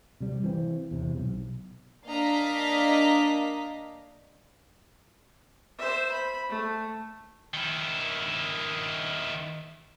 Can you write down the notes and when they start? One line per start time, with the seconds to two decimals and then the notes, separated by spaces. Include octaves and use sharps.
0.21 C3 G3
0.44 E3 C4
0.91 E2 C3
1.18 B1
2.05 A#3 D4 D#5 F5 A#5 B6
5.78 C5 E5
6.12 B5
6.50 A3
7.54 D#3 E4